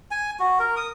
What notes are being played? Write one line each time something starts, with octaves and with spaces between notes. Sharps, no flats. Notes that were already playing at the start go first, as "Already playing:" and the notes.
G#5
F#4
A#4
D#6